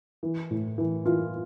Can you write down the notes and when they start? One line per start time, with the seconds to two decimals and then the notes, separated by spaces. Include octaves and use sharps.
0.23 E3
0.51 A2
0.78 E3
1.05 E3 F4